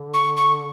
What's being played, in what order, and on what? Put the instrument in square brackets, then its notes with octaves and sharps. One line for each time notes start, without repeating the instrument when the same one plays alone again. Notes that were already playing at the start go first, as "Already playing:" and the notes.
Already playing: [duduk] D3
[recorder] C#6
C#6